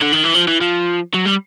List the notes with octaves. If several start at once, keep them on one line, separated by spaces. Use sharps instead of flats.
D3
D#3
E3
F3
E3
F3
F#3
G3